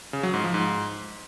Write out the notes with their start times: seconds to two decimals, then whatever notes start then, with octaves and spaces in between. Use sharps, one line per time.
0.13 C#3
0.23 F#3
0.34 G#2
0.44 F3
0.54 G#2